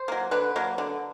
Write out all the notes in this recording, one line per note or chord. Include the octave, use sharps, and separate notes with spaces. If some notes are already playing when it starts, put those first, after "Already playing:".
Already playing: C5
F#3 A#3
D3 B4
F#3 A#3
D3